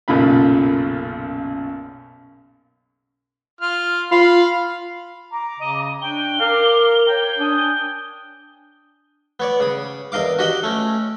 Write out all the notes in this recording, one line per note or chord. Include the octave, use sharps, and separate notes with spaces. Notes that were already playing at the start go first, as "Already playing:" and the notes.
B1 F#2 A#2 C#3 F4 B5
F4 F6
F4 F5 B5
A#5 D6
C#3 D#5
D4 G5 C#6 G7
A#4 F5 D6
C#5 G5
D4 G#5 D#6
B3 C#5 D5
C#3 D#6
E2 A#4 D#5 F5 D6
F#4 G4 D#5 F#5 G5
A3 C#4